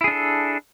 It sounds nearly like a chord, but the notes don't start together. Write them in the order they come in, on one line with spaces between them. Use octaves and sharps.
E4 G#4 D4 A4